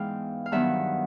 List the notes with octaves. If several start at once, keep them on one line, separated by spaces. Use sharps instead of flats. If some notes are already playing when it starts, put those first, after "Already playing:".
Already playing: G#2 E3 G#3 B3 F5 G5
F5
G2 D#3 F#3 B3 E5 F#5